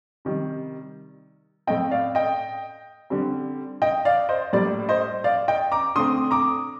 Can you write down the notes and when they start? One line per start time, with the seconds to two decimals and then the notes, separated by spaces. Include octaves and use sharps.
0.25 C3 D#3 G3
1.67 A2 A3 C4 D#5 G5
1.91 D5 F5
2.15 D#5 G5
3.10 D3 G3 C4
3.82 D#5 G5
4.05 D5 F5
4.29 C5 D#5
4.53 A2 G3 A#3 D5
4.89 C5 D#5
5.24 D5 F5
5.48 D#5 G5
5.72 A#5 D6
5.95 D3 A3 C4 C6 D#6
6.31 A#5 D6